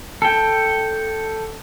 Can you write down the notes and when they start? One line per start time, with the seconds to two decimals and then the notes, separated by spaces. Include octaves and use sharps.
0.22 A4 G5